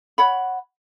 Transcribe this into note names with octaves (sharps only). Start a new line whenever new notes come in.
C#5 F#5 B5